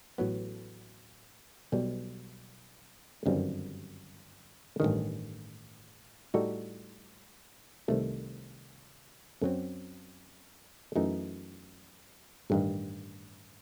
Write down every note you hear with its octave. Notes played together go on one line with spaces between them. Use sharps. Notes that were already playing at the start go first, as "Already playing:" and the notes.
A1 A2 F#3 B3
B1 B2 G3
G1 F#2 D#3 G3 C4
A1 G2 D#3
A2 G3 D#4 F#4 A4
C2 C3 D#3 A3
F#2 F#3 C4
F#2 E3 A3 D#4
A1 G2 D#3